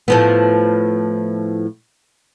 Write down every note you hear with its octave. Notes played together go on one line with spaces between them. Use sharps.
A2 F3 B3